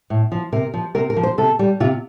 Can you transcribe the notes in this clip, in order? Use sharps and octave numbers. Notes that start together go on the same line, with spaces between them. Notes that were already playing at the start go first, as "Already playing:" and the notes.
A2
F3
C3 A#4
F3
C3 A#4
A#4
F3
C5
C3 A4
G3
C3 F4